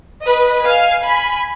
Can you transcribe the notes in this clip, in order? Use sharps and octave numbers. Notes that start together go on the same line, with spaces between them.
B4 D#5
F5 G#5
G#5 B5